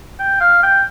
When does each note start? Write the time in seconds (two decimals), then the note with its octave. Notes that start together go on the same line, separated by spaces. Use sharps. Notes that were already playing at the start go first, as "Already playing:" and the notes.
0.19 G5
0.41 F5
0.63 G5